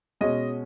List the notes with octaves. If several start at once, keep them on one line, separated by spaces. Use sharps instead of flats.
B2 G#3 C#4 D#5